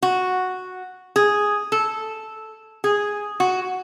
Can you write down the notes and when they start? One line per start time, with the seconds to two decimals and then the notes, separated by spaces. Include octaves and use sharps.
0.03 F#4
1.16 G#4
1.72 A4
2.84 G#4
3.40 F#4